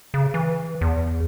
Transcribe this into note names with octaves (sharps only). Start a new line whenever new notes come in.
C#3
E3
E2